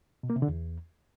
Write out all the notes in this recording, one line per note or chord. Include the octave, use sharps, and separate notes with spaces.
B2
A#3
C3
D3
E2